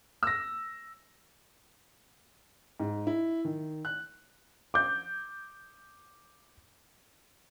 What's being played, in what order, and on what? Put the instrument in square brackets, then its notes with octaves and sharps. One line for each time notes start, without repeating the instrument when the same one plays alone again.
[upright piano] E6 A#6
G#2
E4
D#3
F#6
[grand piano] D6 G6